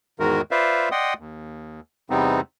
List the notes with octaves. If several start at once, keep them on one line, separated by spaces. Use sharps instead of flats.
E2 G#2 D#3 G#3 F#4 A#4
F4 B4 C5 D5 E5 F5
D5 D#5 F#5 G5 C6 D#6
D#2
E2 C3 G3 B3 C4 D#4